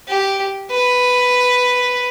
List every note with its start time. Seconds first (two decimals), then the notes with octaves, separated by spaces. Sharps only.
0.08 G4
0.71 B4